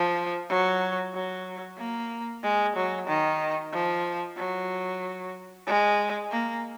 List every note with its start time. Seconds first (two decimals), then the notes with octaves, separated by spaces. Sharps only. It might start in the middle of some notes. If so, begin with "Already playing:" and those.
Already playing: F3
0.49 F#3
1.14 F#3
1.78 A#3
2.43 G#3
2.76 F#3
3.08 D#3
3.73 F3
4.37 F#3
5.67 G#3
6.32 A#3